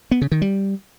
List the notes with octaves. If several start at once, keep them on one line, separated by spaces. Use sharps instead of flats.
B3
C#3
D#3
G3